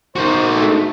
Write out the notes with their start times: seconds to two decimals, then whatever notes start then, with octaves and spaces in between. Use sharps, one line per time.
0.16 D#4 F#4 A#4 C5
0.52 G#3 A3